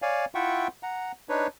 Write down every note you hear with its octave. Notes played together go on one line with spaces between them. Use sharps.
C#5 D5 F5 G#5
E4 F4 E5 F#5 G5 C#6
F#5 A#5
D4 D#4 B4 C#5